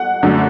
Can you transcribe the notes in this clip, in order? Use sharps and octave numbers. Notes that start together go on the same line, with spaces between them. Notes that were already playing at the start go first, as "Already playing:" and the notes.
Already playing: F#5
F#2 D3 A3